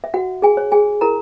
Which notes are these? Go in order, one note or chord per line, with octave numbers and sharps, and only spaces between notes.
E5
F#4 F#5
G#4 G#5
C#5
G#4 G#5
E4 A#4 A#5